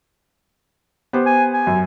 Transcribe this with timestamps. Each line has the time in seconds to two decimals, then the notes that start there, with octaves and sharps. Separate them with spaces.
1.13 B3 G4 C5
1.26 G#5
1.54 G#5
1.67 F#2